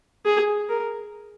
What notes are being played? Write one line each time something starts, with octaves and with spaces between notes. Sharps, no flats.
G#4
A#4